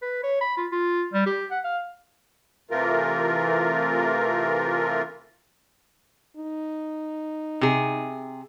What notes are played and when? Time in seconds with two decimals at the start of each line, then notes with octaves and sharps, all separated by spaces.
0.02 B4
0.24 C#5
0.41 B5
0.57 F4
0.72 F4
1.14 G3
1.26 G4
1.51 F#5
1.64 F5
2.71 C3 E3 A3 F4 A#4
6.37 D#4
7.61 C3 G#4